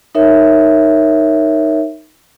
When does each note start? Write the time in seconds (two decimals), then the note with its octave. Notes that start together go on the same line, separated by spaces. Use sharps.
0.15 D#4 A#4 C#5 E5